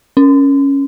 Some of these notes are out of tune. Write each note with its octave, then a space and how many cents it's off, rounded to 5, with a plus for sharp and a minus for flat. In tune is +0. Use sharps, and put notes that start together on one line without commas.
C#4 +0